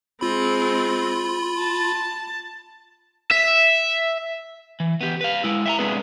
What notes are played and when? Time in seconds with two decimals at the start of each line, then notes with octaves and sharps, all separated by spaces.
0.21 G#3 C4 F4 B5
1.59 A5
3.31 E5
4.80 E3
5.01 B3 G4
5.21 B4 F5
5.44 G#3 E4
5.66 E5 G5 A#5
5.79 G#3 B3 C4 D4 G#4 B4